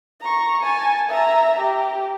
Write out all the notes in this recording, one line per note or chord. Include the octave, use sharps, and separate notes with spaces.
A#5 C#6
G#5 A5
E5 A#5
G4